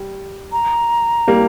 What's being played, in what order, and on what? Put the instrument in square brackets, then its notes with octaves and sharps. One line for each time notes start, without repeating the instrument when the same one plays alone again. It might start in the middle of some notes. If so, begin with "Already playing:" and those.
Already playing: [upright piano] G3
[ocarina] A#5
[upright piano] G3 A#3